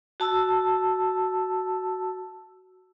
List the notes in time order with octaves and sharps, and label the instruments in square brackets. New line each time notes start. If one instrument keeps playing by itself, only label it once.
[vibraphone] F#4 A5 E6